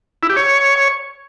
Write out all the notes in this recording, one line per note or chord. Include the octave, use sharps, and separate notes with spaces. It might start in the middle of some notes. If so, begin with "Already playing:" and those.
E4
G4
C#5